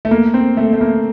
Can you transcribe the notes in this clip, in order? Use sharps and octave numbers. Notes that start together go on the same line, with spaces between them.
A3
A#3
C4
A3
A3
A#3